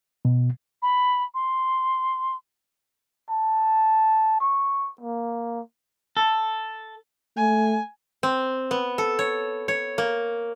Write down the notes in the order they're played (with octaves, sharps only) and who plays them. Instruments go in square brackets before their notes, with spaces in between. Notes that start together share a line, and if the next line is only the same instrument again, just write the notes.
[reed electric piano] B2
[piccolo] B5
C6
[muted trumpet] A5
C#6
A#3
[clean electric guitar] A4
[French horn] A3 [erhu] G#5
[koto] C4
B3
A4
C#5
C#5
A#3